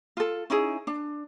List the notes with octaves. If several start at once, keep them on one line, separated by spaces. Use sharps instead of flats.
F4 A4
C#4 D#4 E4 G#4
D4